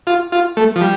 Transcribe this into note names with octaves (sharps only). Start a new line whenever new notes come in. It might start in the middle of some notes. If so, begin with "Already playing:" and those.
F4
F4
A3
F3
G3